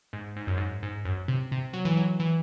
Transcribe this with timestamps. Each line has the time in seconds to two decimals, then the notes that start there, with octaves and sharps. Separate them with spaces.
0.13 G#2
0.36 G#2
0.47 F#2
0.57 G#2
0.83 G#2
1.05 F#2
1.28 C3
1.52 C3
1.73 F#3
1.85 E3
1.97 F#3
2.20 E3